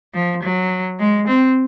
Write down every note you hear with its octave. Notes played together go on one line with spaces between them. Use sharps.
F3
F#3
G#3
C4